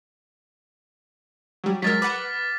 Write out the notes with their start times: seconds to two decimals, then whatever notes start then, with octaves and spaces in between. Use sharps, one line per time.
1.64 F#3 G3
1.82 F#3 G#3 A#4 F6 A6 B6
2.02 B4 F#5 D6